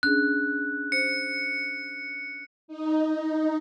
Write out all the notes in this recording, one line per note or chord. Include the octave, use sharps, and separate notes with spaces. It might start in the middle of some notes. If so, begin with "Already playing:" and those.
C#4 D4 G#4 F#6
C5 C#7
D#4